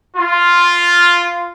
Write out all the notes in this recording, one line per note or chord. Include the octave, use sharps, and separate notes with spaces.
F4